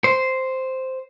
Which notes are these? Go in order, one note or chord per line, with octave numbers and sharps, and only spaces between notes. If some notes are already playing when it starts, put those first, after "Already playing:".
C5